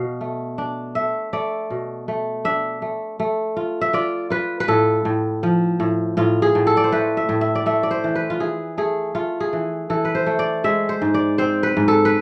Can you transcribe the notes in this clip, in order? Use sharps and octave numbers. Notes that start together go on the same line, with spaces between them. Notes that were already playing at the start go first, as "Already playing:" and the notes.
Already playing: B2 F5
A3
D4
A3 E5
A3 D5
B2
A3
D4 E5
A3
A3
F4
E5
F4 D5
F4 B4
B4
A2 A4
A2
F3
A2
A2 F4
G#4
A2
A4
D5
C5
A3 B4
E5
A2
E5
D5
A3 E5
D5
C5
E3
B4
F4
E3 G#4
A3 G#4
A3 F4
G#4
E3
E3 A4
B4
C5
A3
D5
G#3 E5
C5
G#2
D5
C4 C5
B4
G#2
A4
B4